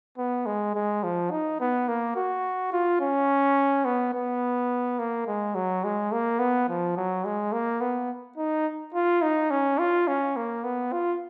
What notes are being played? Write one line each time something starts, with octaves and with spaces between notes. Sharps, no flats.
B3
G#3
G#3
F3
D#4
B3
A#3
F#4
F4
C#4
B3
B3
A#3
G#3
F#3
G#3
A#3
B3
F3
F#3
G#3
A#3
B3
D#4
F4
D#4
C#4
F4
C#4
A#3
B3
F4